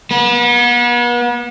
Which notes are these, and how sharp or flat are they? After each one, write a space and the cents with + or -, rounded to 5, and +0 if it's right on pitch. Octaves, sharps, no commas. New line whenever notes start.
B3 -40